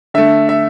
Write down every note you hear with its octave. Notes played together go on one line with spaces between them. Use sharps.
D3 A3 E5
E5